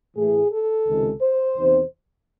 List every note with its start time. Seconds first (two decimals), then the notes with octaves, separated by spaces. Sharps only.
0.17 A2 E3 A3 G#4
0.51 A4
0.86 C#2 C3 D#3 G#3
1.21 C5
1.57 E2 C3 D#3